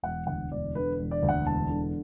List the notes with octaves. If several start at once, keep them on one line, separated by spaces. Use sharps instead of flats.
E1 F#5
D2 F#5
E1 D5
D3 B4
E1
D5
D2
F#5
E1 A5
D3